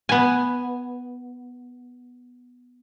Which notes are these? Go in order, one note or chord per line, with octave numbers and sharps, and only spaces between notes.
B3 G#5